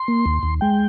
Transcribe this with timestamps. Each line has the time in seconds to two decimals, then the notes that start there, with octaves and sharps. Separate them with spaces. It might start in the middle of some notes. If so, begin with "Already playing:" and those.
Already playing: C6
0.08 A#3
0.26 D#2
0.43 D#2
0.61 G#3 G5